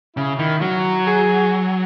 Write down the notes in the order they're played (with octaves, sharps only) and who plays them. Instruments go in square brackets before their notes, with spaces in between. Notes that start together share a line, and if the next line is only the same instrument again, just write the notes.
[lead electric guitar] C#3 [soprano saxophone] E4
[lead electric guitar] D#3 [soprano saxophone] E4
[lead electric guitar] F#3 [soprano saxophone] F#4
[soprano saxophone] G#4